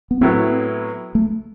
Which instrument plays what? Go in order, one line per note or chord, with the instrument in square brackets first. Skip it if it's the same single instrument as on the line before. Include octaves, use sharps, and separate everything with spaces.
[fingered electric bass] B3
[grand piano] A2 F#3 B3 E4 [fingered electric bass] C4
[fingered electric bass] A3